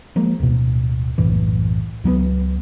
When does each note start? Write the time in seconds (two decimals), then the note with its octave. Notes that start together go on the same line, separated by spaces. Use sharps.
0.16 F3 G#3 A#3
0.40 D1 B2
1.18 F#1 B1 A2 E3
2.04 C#2 F#3 A#3 B3